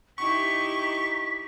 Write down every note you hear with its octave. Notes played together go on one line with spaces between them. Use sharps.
D#4 E4 G4 C#6 B6